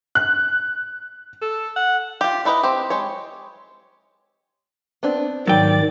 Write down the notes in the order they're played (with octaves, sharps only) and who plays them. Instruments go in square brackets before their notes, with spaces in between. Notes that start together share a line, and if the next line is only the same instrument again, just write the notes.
[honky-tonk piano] F#6
[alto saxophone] A4
F#5
[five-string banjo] F4 G4
D4 E4 B4 D#5 A#5
C4 G4
G#3 G4 C#5
B3 C4 D4
[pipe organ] G#2 D#3 [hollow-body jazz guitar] F#3 G5 [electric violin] D5 A6